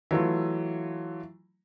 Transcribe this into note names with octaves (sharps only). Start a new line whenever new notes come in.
E3 F#3 A3 F4